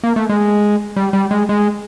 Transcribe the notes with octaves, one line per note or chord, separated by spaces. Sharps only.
A#3
A3
G#3
G3
G3
G#3
G#3